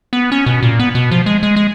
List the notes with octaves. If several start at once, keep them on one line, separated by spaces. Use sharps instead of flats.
B3
C#4
B2
A#2
B3
B2
F3
G#3
G#3
G#3